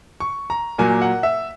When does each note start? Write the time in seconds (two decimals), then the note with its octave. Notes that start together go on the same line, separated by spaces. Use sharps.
0.20 C#6
0.50 A#5
0.78 A#2 F#3 A#3 G#5
1.02 F#5
1.23 E5